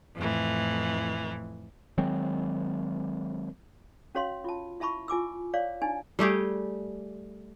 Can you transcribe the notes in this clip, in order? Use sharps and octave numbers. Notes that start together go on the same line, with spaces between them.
F2 A2 E3
D#3 F#3 G#3 C4
C#4 F#4 C#5 F5 C6
F4 A5
E4 E5 A5 B5 C#6
F4 G#5 D6 E6
C#5 D5 F5
D4 D#4 G#5
G3 A3 G4 G#4